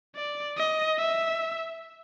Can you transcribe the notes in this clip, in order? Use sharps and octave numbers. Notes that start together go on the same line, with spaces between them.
D5
D#5
E5